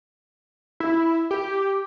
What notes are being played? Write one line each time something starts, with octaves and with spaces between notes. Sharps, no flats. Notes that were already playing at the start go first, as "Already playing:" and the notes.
E4
G4